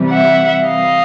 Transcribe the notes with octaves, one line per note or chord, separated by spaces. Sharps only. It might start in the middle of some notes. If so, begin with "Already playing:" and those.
Already playing: C3 E3 G3
E5 F#5
D#5 F5